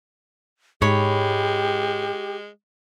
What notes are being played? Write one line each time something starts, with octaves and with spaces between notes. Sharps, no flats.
G#2 G#3 G4 C#5 B5